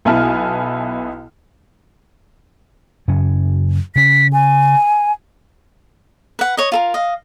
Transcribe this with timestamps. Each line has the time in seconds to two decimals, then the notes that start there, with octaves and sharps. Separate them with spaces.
0.05 B1 B3 E4 G#5 A5 F6
3.08 F#2 C#3 C#4
3.96 C#3 C#4 B6
4.33 G#5
6.39 B4 F#5
6.57 C#5 D#5
6.72 F4 A4 A#4
6.94 D#5 F5